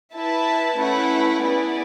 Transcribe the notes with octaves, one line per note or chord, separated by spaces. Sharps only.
E4 B4 E5 A5
A3 C#4 E4 B4 F#5
B3 E4 G#4 B4 D5